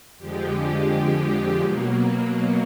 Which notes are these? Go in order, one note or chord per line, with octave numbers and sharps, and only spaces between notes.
F2 D3 F3 G#3 G4
G4
B2 F#3 A#3